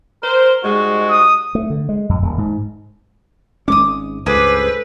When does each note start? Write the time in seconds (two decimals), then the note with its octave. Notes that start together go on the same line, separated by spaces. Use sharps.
0.22 A#4 C5
0.64 G#2 G3 G#3 F#4
1.10 D#6
1.55 A3
1.70 D3
1.89 G#3
2.09 F2
2.22 D#1
2.38 G#2
3.68 G#1 G#3 C#4 D6 D#6
4.26 C#2 G2 G#4 A4 B4 C5 D6